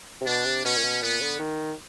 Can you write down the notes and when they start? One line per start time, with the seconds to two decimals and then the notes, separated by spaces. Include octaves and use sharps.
0.21 C3
0.27 B2 D4
0.46 C3
0.65 B2 C#4
0.77 A#2
0.84 B2
1.02 A#2 B3
1.21 D3
1.40 D#3